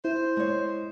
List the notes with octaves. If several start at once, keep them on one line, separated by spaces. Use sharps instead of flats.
E4 C5
G#3 C#5